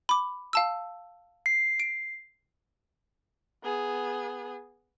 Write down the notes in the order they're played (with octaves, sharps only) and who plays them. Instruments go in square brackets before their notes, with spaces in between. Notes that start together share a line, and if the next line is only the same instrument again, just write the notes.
[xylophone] B5 D6
F5 A5 E6
[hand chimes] C7
[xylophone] D7
[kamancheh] B3 G#4